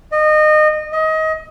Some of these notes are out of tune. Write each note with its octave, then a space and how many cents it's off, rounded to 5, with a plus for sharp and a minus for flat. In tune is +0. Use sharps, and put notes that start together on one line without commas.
D#5 -25
D#5 +25